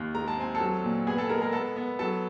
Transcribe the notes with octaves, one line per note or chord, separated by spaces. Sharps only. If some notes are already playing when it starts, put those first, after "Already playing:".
Already playing: D#2
G#3 A#5
A5
C4 G#5
A4 A5
F#3
A#2
B3 G#4 G#5
A4 A5
G#3 A#4 A#5
A#4 A#5
B3 A4 A5
B3
F#3 A4 A5